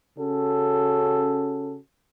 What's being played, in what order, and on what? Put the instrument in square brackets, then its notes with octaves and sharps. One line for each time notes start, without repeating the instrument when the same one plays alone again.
[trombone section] C#3 C#4 F#4 A4